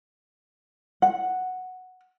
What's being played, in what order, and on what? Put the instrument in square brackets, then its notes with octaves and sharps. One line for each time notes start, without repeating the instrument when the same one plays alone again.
[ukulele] F#5